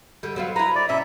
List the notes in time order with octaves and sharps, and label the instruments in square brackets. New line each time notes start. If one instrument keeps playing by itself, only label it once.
[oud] D3 G3
F#3 B3 F4
[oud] E4 B4 [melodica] A#5
[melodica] D5
[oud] B2 C#4 [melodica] E5